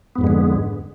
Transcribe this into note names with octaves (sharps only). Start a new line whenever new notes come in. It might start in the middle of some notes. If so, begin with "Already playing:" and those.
F2 G#2 D3 G#3 B3